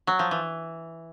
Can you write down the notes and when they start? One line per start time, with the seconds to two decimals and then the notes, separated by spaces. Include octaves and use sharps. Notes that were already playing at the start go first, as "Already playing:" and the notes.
0.07 F#3
0.19 F3
0.31 E3